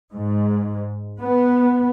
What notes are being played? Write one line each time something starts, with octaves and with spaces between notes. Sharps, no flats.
G#2
B3